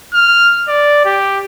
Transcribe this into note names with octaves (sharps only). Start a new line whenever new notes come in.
F6
D5
G4